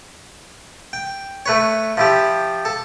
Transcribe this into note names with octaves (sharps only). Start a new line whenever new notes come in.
G5
A3 B4 C#5
F3 E4 G4
A4